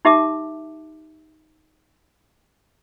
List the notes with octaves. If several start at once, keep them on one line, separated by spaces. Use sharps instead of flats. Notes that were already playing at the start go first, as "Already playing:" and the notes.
D#4 G4 E5 A5 D6